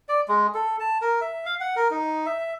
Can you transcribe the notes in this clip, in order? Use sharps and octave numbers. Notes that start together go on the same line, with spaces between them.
D5
G#3
A4
A5
A#4
E5
F5
F#5
A#4
D#4
E5